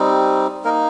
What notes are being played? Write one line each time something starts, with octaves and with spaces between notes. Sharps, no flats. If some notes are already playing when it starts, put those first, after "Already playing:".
Already playing: G3 C4 D#4
A#3 D#4 A#4